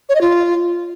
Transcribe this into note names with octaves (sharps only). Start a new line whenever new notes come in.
C#5
D#5
F4